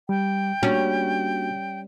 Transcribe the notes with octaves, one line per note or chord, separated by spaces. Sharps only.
G3 G5
G3 A#3 C#4 D4 F#4